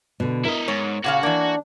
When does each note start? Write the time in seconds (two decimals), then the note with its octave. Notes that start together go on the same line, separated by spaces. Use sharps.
0.20 B2 D3
0.45 E4 A#4 D#5
0.68 G#2 C#5
1.04 A#2 C#3 F#4 F5 F#5
1.23 E3 A#3 D4